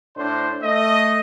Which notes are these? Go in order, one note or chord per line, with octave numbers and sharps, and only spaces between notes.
A2 D4 C5
A3 D#5